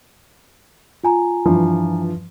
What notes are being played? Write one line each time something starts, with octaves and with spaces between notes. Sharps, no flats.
F4 G#5 A#5
G2 E3 F3